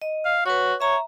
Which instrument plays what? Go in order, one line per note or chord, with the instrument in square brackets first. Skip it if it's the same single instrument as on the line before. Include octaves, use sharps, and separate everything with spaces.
[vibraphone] D#5
[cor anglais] F5
[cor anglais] F#4 [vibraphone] B4 C#5
[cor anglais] C#5 [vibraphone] E5 A#5